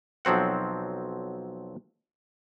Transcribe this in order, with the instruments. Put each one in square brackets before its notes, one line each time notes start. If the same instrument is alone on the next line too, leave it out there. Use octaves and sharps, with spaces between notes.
[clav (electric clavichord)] B1 F3 F#3 C4 F#5